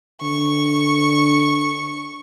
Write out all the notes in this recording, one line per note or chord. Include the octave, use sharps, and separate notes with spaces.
D3 C#6